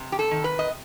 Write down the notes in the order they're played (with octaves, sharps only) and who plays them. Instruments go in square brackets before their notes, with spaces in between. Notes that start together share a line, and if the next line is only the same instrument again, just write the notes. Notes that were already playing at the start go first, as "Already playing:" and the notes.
Already playing: [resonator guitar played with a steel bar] C3
G4
A4
D#3
B4
D#5